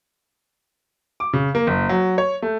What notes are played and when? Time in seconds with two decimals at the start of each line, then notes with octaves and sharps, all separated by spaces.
1.20 D6
1.33 C#3
1.55 A#3
1.67 F#1
1.89 F#3
2.18 C#5
2.42 A3